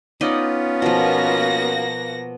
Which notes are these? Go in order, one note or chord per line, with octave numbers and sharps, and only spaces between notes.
B3 C#4 D#4 F4 D5 D#5
B2 F3 A#3 F#4 A#6